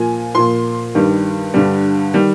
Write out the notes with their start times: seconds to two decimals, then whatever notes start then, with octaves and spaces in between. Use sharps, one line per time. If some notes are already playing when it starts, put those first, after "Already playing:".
Already playing: A#2 F3 G#5
0.35 A#2 F3 C6
0.95 G2 D#3 G3
1.54 G2 D3 G3
2.14 D#3 G3